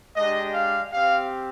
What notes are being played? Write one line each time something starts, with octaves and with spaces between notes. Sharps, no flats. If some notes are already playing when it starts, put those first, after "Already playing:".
G#3 D4 G4 D#5
F5
C4 G4 F5